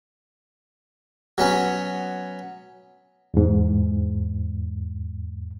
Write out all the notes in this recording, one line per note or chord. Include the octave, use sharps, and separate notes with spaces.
F#3 B3 C#4
E2 G#2